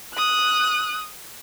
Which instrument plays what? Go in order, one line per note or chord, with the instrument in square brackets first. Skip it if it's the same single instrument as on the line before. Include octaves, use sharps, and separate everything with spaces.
[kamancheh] D#6 F#6